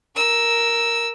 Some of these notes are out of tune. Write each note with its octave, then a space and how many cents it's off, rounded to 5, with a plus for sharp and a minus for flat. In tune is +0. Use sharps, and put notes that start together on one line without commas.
A#4 +0 E6 +0